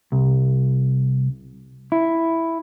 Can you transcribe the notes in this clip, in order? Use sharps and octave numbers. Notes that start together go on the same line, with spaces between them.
C2
E4